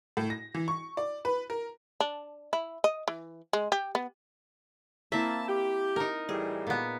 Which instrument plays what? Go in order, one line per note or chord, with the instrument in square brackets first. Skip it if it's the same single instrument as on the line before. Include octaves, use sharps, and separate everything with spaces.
[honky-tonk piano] A2
A#6
E3
C#6
D5
B4
A#4
[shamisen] D4
E4
D#5
E3
G#3
G4
B3
[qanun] A#3 C4 E4 [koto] E5 [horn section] A5
[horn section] G4
[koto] D#4 A#4
[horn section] A2 E3 G3 [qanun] G#4
[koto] A#2 B3